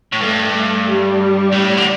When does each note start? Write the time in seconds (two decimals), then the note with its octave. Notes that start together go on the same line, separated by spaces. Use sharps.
0.12 A2
0.21 G2 A3
0.54 A3
0.86 G3
1.52 A2
1.77 D3